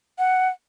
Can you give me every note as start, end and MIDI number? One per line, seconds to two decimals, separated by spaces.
0.19 0.48 78